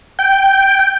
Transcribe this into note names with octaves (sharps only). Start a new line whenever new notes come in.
G5